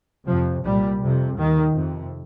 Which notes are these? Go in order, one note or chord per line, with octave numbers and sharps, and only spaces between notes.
F2 C3 F3
C2 A#2 G3
F2 C3
D#2 D#3
F2 C3